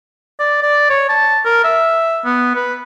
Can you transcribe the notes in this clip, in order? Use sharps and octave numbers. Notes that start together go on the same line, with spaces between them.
D5
D5
C#5
A5
A#4
E5
B3
B4